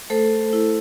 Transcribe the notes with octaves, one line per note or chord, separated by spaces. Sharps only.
A3 A4 C5
E4